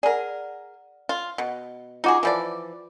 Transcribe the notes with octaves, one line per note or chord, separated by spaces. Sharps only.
G#4 A#4 D5 F#5
F4
B2
D#4 F4 F#4 G#4 G#5 D6
E3 F3 D5 B5